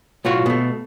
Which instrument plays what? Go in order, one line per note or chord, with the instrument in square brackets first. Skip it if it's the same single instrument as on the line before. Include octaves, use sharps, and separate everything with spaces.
[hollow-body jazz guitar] B1 A2 F4 F#4
B2 A3